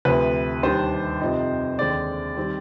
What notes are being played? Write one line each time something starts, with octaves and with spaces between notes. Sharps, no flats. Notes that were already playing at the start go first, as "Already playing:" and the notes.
D2 C3 F3 B4
D#2 D#3 G3 D4 C5
F2 C3 F3 C4 D#4
D#2 D3 G#3 C4 D#4 D5
D#3 G3 C4